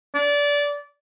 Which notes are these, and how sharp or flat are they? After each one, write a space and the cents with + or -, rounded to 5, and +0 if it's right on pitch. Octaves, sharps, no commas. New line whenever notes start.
D5 -20